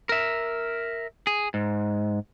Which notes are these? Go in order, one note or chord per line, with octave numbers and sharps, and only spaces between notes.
A#4 E5
G#4
G#2